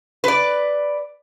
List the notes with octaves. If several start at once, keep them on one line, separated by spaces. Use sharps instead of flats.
B4 D5